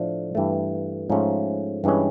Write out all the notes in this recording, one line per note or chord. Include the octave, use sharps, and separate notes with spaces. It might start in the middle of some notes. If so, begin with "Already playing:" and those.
Already playing: A2 F3 A3 D4
G2 E3 A3
G#2 F3 A3 C#4
G2 E3 G#3 C#4